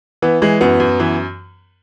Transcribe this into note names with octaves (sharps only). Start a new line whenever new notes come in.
E3 B3
E3 G#3
F#2 B3
F#2
E3